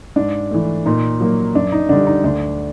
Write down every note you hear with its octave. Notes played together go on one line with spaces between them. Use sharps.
G#2 D4
E3 A3
A#2 D#4
F#3 A#3
F#2 D4
D#4
D3 G3 D4
D#4
D2 D4